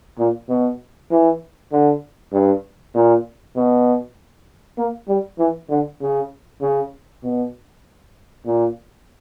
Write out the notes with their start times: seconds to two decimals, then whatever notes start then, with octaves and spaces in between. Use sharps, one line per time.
0.19 A#2
0.49 B2
1.11 E3
1.72 D3
2.33 G2
2.95 A#2
3.56 B2
4.78 A#3
5.08 G3
5.39 E3
5.69 D3
6.01 C#3
6.61 C#3
7.23 B2
8.46 A#2